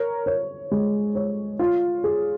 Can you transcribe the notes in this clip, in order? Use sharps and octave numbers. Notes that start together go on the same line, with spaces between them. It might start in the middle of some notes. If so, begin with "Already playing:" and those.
Already playing: A#4 C#5
C#5
G#3
C#5
F4
G#4